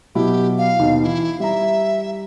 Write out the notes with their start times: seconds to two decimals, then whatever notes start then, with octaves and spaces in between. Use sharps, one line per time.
0.15 B2 F#3 E4 G4
0.58 F5
0.79 D#2 B2 D#3
1.03 E3 E4
1.40 G3 E5 A#5